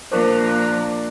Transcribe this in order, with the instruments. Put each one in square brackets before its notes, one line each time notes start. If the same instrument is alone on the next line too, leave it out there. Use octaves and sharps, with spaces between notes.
[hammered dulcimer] A#2 D4 C#6 [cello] F3 A#3 [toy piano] A#4 C5